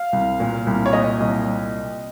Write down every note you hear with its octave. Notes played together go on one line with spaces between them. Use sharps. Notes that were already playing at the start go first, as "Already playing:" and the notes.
Already playing: F5
C2
A#2
C2
C#5
A#2 D#5
C2